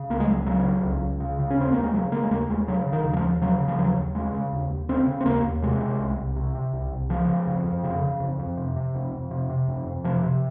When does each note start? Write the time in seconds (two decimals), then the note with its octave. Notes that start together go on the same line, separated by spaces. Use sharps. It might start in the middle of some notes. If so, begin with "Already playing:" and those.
Already playing: C#3
0.09 C#2 A#3
0.20 G#3
0.28 C#2 F#3
0.47 C#3 F#3
0.65 C#3
0.84 C#2
1.02 C#2
1.20 C#3
1.39 C#3
1.51 C#4
1.57 D#2 C4
1.72 D#2 A#3
1.83 G#3
1.94 C#3 F#3
2.12 C#3 A#3
2.24 G#3
2.31 D#2 A#3
2.49 D#2 G#3
2.68 C#3 F#3
2.87 C#3
2.92 D#3
3.05 D#2
3.13 F#3
3.17 F3
3.23 D#2
3.41 C#3 F#3
3.60 C#3
3.68 F3
3.78 D#2 F#3
3.97 D#2
4.15 C#3 G#3
4.34 C#3
4.52 D#2
4.70 D#2
4.89 C#3 C4
5.07 C#3
5.21 C4
5.26 D#2 A#3
5.44 D#2
5.62 C3 G#3
5.81 C3
6.00 C2
6.18 C2
6.36 C3
6.55 C3
6.73 C2
6.92 C2
7.10 C#3 F3
7.28 C#3
7.47 F2
7.65 F2
7.84 C#3
8.03 C#3
8.20 F2
8.39 F2
8.57 C3
8.76 C3
8.95 F2
9.13 F2
9.31 C3
9.50 C3
9.68 F2
9.87 F2
10.04 C3 F3
10.23 C3